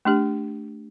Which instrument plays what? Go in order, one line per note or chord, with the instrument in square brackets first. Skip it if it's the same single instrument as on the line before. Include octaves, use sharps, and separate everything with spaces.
[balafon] A3 D4 G4